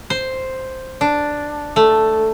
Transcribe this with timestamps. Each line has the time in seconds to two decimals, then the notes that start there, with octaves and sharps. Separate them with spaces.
0.10 C5
1.01 D4
1.76 A3